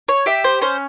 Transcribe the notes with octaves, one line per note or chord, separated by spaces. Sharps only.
C#5
G4 E5
C5
C#4 C5